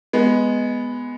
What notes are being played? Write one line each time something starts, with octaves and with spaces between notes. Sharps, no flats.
G#3 B3